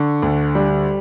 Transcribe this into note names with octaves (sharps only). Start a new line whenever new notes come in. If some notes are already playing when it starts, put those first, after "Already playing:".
Already playing: D3 C#6
D2
G3